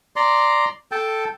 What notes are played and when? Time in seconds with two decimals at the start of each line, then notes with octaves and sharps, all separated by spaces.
0.16 D5 A#5 C6
0.92 A4 G5 A5